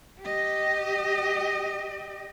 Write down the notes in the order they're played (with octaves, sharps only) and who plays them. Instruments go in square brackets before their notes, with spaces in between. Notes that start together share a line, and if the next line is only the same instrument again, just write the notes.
[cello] G4 D#5